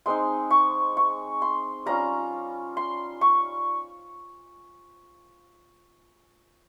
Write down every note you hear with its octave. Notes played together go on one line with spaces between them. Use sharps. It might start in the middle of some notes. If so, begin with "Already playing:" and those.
G#3 C4 D#4 C6
C#6
C#6
C6
G3 C#4 F4 A#5
C6
C#6